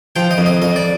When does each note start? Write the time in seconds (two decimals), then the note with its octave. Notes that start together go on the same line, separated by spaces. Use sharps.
0.16 F3 G5
0.31 D#5
0.38 F2
0.46 D#5
0.62 F2 D#5
0.76 D5